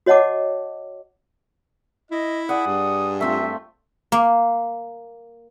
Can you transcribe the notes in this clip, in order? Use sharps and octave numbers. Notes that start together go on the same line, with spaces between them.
F#4 C#5 D#5 F#5 A5 D6
E4 D#5
G#4 D5 F#5 D#6
G2
A3 C4 F4 E5
A#3